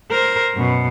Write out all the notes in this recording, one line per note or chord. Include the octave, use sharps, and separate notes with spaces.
A#4 C5
F#2 B2